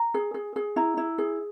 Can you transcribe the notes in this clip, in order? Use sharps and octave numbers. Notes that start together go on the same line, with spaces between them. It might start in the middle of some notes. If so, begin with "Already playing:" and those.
Already playing: A#5
G#4
G#4
G#4
E4 A#5
E4
G#4